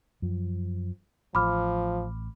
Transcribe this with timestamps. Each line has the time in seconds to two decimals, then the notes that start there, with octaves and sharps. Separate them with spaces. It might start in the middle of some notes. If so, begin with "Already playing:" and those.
0.22 F#2 F3
1.35 A1 F3 B5 D6 F6